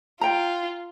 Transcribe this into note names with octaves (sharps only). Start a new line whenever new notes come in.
F4 G5 A#5